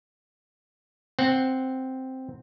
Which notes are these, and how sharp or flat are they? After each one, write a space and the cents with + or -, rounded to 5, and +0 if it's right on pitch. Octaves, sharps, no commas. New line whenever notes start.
C4 +0 F#5 +0